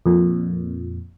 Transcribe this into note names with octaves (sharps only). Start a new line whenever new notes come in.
F2 A#2